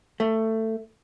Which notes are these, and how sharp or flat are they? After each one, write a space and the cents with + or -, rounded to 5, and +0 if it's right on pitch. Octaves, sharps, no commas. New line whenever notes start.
A3 +15